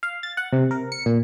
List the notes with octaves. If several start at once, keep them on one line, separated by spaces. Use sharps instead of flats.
F5
A6
F#5
C3
A#4
C#7
A#2